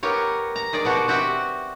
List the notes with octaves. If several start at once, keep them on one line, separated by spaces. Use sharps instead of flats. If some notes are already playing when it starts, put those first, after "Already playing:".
B3 G4 A#4 C#5
A#5
D#3 G#4 D5
B2 F#4 G4
C4 F#4 G4 E5